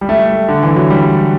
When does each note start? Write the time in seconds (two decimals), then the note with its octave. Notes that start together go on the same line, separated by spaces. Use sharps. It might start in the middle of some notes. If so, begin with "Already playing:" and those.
0.01 G3
0.09 A3
0.48 D3
0.63 E3
0.76 F#3
0.90 G3